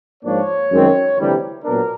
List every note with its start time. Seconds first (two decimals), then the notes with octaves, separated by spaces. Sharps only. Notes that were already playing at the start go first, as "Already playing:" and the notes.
0.23 G#2 F3 A#3 D4 C#5
0.71 F#2 D#3 G#3 C4
1.17 D2 C3 E3 G3
1.64 A#2 F#3 B3 D4 A#4